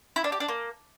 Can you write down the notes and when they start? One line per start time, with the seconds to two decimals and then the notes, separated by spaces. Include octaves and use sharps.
0.16 E4
0.24 D4
0.32 G4
0.40 D4
0.48 A#3